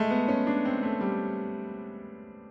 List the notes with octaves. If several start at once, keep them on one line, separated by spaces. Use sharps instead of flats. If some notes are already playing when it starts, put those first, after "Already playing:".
Already playing: G#3 A3
B3
C#4
D4
C4
A3
G3